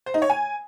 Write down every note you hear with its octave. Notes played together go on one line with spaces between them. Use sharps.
C5
D#4
C#5
G#5